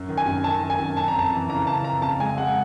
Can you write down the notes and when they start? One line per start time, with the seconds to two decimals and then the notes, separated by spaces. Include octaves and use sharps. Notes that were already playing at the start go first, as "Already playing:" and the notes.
Already playing: F#2
0.09 D#3
0.18 G#5
0.26 F#2
0.44 D#3 A5
0.61 D#3
0.70 G#5
0.79 F#2
0.97 F2 A5
1.08 A#5
1.15 F2 A5
1.32 E3
1.50 C#3 A#5
1.67 F2 A5
1.84 F2 A#5
2.02 C#3 A5
2.20 G#3 G#5
2.37 G#3 F#5